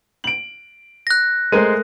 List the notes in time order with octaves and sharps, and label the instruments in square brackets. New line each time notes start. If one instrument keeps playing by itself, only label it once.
[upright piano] D7 F#7
[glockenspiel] F#6 A#6
[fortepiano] G#3 C5 [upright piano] A3 A#4 D#7